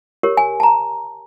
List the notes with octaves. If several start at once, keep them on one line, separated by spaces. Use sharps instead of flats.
G4 A#4 C#5
G#5
A5 A#5